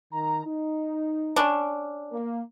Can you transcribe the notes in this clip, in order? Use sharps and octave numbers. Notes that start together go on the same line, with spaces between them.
D#3 A#5
D#4
C#4 D4
A#3